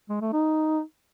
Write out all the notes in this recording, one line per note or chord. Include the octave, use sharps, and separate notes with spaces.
G#3
A3
D#4